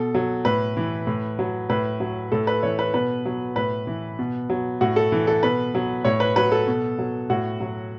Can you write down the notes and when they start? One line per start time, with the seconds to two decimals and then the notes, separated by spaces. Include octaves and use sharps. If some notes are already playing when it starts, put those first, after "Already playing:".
Already playing: B2 A4
0.15 F#3
0.45 A2 B4
0.77 E3
1.07 A2
1.39 F#3
1.69 A2 B4
2.00 F#3
2.32 A2 A4
2.47 B4
2.63 E3 C#5
2.79 B4
2.94 B2 B4
3.25 F#3
3.56 A2 B4
3.87 E3
4.19 B2
4.50 F#3
4.81 A2 F#4
4.96 A4
5.12 E3
5.27 A4
5.43 B2 B4
5.75 F#3
6.05 A2 C#5
6.20 B4
6.36 F#3 B4
6.52 A4
6.67 B2
6.98 F#3
7.30 A2 F#4
7.60 F#3